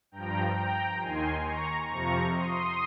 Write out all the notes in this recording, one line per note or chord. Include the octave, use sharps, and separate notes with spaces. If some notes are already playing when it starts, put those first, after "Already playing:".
G2 F3 G5 A#5
G5 A#5
D#2 D#3 G#5 C6
A#5 C#6
F2 C3 F3 A#5 C#6
C6 D#6